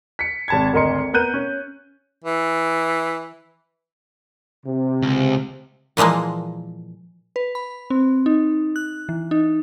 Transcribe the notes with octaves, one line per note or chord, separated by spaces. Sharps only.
B6 C#7
G#1 A5 G#6
G#1 D2 A#4 D#5 C6 C#7
B3 A#4 F#6 G6 D#7
C#4
E3
C3
C#2
A#2 E3 F3 G#3 A#3
B4
B5
C4
D#4
F#6
E3
D#4